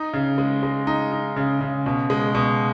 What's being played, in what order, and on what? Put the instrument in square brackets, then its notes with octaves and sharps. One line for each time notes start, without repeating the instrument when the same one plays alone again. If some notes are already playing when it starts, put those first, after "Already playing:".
Already playing: [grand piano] D#4
C#3
G#3
G#3
D#4
D#4
C#3
C#3
B2
G#3
B2